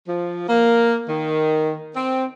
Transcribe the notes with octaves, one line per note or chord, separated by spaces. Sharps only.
F3
A#3
D#3
C4